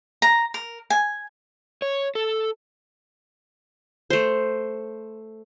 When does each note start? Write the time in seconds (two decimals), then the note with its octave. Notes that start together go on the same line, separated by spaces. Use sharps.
0.22 A#5
0.54 A#4
0.90 G#5
1.82 C#5
2.15 A4
4.10 A3 C5